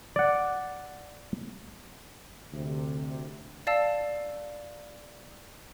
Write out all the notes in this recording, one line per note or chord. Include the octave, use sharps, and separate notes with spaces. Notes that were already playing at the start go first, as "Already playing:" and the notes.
D5 F#5
D2 C3
D5 F5 A5 E6